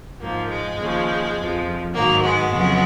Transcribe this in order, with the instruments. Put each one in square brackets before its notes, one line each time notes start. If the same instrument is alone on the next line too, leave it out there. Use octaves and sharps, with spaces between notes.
[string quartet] G#2 F3 A#3
G#3
D#2 C#3 F3
F2 F3
G#2 D#3 F#3 A#3
G#3 B3
F2 C#3 F#3